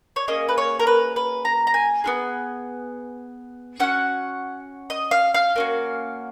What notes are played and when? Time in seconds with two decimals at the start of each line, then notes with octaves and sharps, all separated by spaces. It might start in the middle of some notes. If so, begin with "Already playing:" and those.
0.16 C#5
0.28 A#3 C#4 G#4 D#5
0.49 B4
0.58 C#5
0.79 A#4
0.87 B4
1.16 B4
1.45 A#5
1.67 A#5
1.74 G#5
2.04 B3 F4 G#4
3.80 C#4 F#4 F#5
4.90 D#5
5.11 F5
5.34 F5
5.56 A#3 C#4 F#4